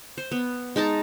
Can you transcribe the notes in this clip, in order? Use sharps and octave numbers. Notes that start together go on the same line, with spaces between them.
C5
B3
G#3 D#4 A5 A#5